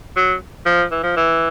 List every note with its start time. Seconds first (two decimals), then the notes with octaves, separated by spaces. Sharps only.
0.17 F#3
0.65 F3
0.91 E3
1.03 F3
1.17 E3